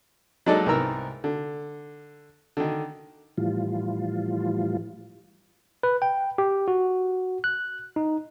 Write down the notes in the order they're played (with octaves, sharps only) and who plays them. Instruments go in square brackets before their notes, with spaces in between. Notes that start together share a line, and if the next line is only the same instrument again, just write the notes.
[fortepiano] F#3 G#3 A#3 D#4 A4 D5
C2 G#2 B3 A#4 A#5 E6
D3
D3 D#3
[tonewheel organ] A2 E3 F3 G3 F4
[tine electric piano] B4
G5
G4
F#4
F#6
D#4